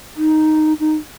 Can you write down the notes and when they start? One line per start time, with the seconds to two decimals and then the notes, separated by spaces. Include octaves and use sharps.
0.16 D#4
0.80 D#4